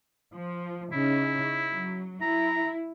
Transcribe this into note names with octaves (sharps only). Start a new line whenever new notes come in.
F3
C#3 C#4 D#4 E4
F#3
E4 A#5